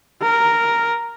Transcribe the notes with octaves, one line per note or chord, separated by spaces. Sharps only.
A#4